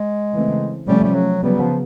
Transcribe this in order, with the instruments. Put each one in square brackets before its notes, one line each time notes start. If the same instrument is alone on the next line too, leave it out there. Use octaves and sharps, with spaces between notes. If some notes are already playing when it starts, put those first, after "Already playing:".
Already playing: [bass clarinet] G#3
[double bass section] C#3 E3 A3 C4
[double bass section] C3 F3 A3 C#4 [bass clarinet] G3
[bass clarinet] G3
F#3
[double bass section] C#3 F#3 B3 [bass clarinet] G3
[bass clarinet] F3